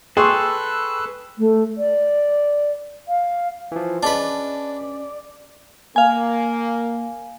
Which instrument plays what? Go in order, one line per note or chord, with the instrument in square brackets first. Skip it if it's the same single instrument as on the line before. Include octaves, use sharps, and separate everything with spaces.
[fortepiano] G#4 [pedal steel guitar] A4 [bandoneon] B4 E6 F#6 [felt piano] G5 C6 C#6
[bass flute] A3
D5
F5
[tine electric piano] E3 F3
[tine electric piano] C#4 [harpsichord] D4 B4 [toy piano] G#4 D#5 A5 [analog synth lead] D5
[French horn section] A#3 [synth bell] F5 G#5